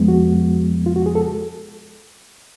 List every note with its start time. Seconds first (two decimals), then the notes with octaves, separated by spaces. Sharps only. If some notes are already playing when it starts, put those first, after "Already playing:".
Already playing: F2 F3 G#3 B3
0.08 F#4
0.86 F4
0.96 F#4
1.06 G#4
1.15 A4